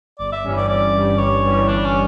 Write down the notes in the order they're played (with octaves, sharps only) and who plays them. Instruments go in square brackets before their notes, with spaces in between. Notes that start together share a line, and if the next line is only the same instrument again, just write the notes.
[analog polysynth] G1 [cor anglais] D5
[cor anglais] E5
[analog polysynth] G2 E3 G3 C#4
[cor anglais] D5
[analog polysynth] G1 [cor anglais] D5
[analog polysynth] G2 E3 G3 C#4
[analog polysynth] G1 [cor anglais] C#5
[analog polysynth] G2 E3 G3 C#4
[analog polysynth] G1 [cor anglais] D4
[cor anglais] C#4